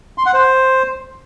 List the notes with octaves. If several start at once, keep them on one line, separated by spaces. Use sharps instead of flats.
C6
F#5
C5